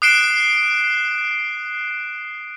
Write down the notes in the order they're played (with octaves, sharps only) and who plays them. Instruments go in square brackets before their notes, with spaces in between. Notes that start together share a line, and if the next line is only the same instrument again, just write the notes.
[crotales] D#6 F#6 C7 D7 E7 G7